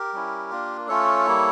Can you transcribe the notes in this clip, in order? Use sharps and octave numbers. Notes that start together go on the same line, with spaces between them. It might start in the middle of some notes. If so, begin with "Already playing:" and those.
Already playing: G4 A#4
G3 C#4 E4
A#3 D4 F4
A3 C#4 F4 A4 C#5
G3 A#3 E4